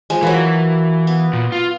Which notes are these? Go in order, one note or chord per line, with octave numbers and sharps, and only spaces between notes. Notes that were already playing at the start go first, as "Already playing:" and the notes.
F3 G#3
E3 F#3 A#3
B3
A#2
F4